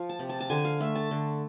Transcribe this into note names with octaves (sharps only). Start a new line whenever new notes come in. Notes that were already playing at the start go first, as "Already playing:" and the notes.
Already playing: F3 F5
A5
C3
A5
A5
D3 G#5
F5
A3 E5
A5
D3